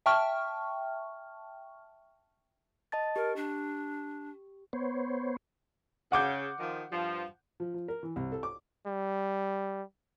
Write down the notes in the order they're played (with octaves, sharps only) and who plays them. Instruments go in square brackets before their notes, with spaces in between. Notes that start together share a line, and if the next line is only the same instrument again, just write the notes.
[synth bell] E5 G5 A5 C#6 F6
[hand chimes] D#5 A5 A6
[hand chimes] G4 [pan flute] A#4
[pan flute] D4
[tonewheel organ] B3 C5 C#5
[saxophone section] C#3 [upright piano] F#5 D6 G6
[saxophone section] D#3 F3
G2 F3
[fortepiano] F3
F3
A#4
E3
C2
A4
D6
[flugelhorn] G3